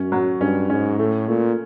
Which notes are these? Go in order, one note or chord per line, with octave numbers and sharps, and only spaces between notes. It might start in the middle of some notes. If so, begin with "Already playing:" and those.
Already playing: F#2 C#4
F#3
G2 C#4
G#2 C#4
A2 A3
A#2 A3